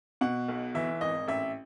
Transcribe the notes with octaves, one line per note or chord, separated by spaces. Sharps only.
B2 F#5
B1
E3 E5
G#1 D#5
A1 E5